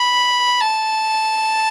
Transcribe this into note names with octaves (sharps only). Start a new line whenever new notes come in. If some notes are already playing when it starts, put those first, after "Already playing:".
Already playing: B5
A5